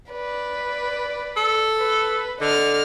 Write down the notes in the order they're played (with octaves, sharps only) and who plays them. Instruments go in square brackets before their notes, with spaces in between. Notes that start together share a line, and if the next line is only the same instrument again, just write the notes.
[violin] B4 D5
[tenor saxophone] A4
[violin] B4
[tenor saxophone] D3 [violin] D#5 F6